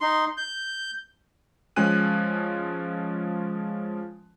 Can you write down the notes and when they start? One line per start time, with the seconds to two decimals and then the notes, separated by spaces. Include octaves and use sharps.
0.01 D#4 C6
0.37 G6
1.76 F3 G#3 C#4 G#5 F#6 D#7